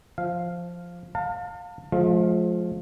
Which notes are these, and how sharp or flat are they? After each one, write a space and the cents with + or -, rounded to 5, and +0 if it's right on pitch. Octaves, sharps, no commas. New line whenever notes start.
F3 +0 F5 -5
F5 +25 A5 +40
F3 +15 G#3 +45 F5 +0